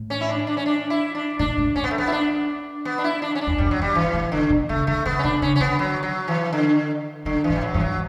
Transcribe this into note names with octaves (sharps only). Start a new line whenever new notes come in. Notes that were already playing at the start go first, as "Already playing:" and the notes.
Already playing: A2
C#4
E4
D4
D4
C#4
D4
E4
D4
A2 D4
A2
A2 C#4
B3
A3
B3
E4
D4
B3
D4
E4
D4
C#4
D4
E2
F#2 G3
F#3
F#2
G3
G2 E3
A2
B2 D3
B2
C#3 A3
D3 A3
C#3 B3
C#4
B2 D4
C#3 C#4
C#4
D3 B3
F#3
F#3
E3
D3
D3 F#3
E3
A2
G3
F#3
G2 E3
F#3